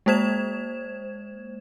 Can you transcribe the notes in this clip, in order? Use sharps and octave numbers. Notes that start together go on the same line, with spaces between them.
G#3 A#3 C5 G#6 E7